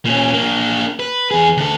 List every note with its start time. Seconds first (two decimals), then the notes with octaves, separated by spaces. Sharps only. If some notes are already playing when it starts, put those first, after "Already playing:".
0.05 A#2 C#4
0.34 A#3 D4
1.00 B4
1.31 E2 G#4
1.57 D2 A4